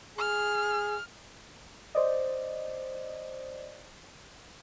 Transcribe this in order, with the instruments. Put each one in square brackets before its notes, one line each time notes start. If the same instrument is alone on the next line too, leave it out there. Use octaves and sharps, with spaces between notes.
[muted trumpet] G#4 [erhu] F6
[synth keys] C5 D5 D#5